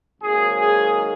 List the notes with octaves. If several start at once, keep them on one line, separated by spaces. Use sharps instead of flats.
G#1 G#2 F#3 A#3 G#4
G#4